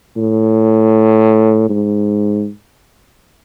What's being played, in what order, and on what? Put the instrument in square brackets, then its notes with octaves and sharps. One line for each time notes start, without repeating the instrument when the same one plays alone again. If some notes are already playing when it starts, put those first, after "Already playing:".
[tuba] A2
G#2